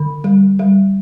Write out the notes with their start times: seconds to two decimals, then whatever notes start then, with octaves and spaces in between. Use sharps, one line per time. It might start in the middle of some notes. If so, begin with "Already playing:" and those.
Already playing: D3
0.24 G3
0.59 G3